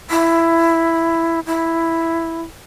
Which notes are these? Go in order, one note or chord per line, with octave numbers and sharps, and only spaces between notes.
E4
E4